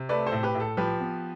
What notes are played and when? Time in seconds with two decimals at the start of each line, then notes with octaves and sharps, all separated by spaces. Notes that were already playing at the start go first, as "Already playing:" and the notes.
Already playing: C3
0.09 A3 B4 D5
0.26 A4 C5
0.32 A2
0.43 G4 B4
0.55 A2
0.60 A4
0.77 F3 G4 B4
1.00 B3